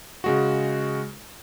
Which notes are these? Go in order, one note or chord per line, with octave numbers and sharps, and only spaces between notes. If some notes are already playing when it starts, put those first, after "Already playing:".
C#3 G#3 F#4